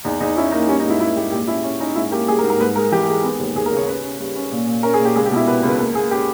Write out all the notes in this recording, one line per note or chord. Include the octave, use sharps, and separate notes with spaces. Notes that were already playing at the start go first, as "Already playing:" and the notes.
E2 D#4
E2 D#4
C#4 E4
A#3 D#4
G3 C#4
D#4
G#2
E4
A#3 E4
G#2 G4
A#2 G4
C#4 E4
C#4
C#4 D#4
G#2 E4
A#3 G4
G3 G#4
A#4
G#2
A#4
G#2 B4
G#3 A#4
E3 G4
G#3
B3
D#2
D#2 G#4
A#4
C#3
C#5
C#4 B4
C#4
G3
C#4
A#2
A#2
C#4 A#4
G#4
A#2
G4
C#2 G#4
G4
B2 E4
B2 B4
C#2
B4
A#3
A#3 G#4
C#4 G4